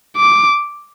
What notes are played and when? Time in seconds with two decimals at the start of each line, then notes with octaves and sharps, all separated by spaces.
0.17 D6